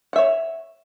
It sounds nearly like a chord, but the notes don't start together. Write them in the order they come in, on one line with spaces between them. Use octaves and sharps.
F#5 E5 C#5